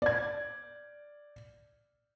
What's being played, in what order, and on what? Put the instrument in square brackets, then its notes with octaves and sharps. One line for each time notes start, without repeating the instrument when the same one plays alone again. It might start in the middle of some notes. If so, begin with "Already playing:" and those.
[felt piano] D5 G#6